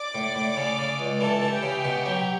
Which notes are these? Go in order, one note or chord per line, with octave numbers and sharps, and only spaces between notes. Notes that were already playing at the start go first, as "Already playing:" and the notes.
Already playing: D5 D6
A2
A2
C#3
C#3
C#2
E3 A4 A5
E3
G4 G5
C#3
B2
F#3